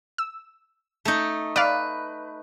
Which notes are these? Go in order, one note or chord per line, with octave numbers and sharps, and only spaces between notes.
E6
A3 D#4
B4 D5 F5